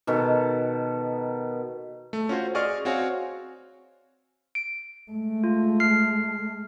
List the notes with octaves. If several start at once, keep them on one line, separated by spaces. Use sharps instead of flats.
B2 D#3 A4 B4
A3
C#4 F4 F#4 C5
G#4 D5 D#5 C#6 F6
C4 F#4 C#5 F5 G#5
D7
G#3 A3
F4
F6 C7